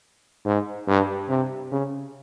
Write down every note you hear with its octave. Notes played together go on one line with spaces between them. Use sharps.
G#2
G2
C3
C#3